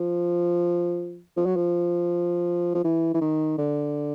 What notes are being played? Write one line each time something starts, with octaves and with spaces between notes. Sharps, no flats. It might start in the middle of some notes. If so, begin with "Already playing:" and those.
Already playing: F3
F3
F#3
F3
F3
E3
E3
D#3
D3